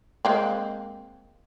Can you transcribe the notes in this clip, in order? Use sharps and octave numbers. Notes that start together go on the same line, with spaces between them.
G#3 A#3 C4